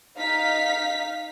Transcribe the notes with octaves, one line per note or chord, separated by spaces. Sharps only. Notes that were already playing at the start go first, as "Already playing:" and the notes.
D#4 F5 B6